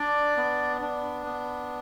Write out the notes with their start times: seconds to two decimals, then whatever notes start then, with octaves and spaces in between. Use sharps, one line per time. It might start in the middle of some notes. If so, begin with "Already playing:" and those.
Already playing: D4 D5
0.37 B3
0.81 D4
1.26 B3